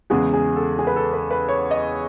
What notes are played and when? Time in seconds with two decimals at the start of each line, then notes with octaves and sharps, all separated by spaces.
0.10 E2 C#3 G#3 B3 G#4
0.33 G#4
0.56 A4
0.79 G#4
0.87 B4
0.96 A4
1.13 B4
1.31 B4
1.48 C#5
1.71 D#5